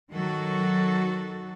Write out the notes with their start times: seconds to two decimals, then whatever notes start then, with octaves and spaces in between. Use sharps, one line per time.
0.10 D#3 F#3 F#4 A4